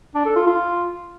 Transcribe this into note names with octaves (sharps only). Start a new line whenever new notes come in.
D4
A4
F4
F4